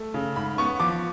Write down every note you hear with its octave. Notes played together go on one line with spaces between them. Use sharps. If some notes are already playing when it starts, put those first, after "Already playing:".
Already playing: A3
C#3
G#2 B5
B3 C#6
F3 D6